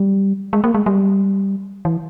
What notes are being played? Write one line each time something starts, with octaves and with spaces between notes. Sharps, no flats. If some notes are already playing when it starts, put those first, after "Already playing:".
Already playing: G3
G#3
A#3
G#3
G3
E3